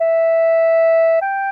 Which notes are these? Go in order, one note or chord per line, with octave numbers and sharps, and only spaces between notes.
E5
G5